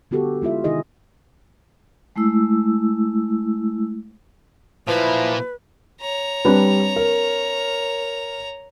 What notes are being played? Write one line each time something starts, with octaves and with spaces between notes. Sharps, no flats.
D3 B3 F#4 G4 A4
G#3 E4 F4 E5
C3 D#3 D#4 E4 G#4 D#5
G#3 A3 E4 E6
A#2 F3 F#3 A#3 E4 B4
C#5 A#5
G3 C4 D4 B4
A#4